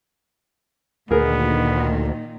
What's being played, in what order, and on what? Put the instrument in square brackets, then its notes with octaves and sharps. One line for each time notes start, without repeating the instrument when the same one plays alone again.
[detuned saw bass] D2 [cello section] A#2 D#3 [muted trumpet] B3 [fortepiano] G#4 A#4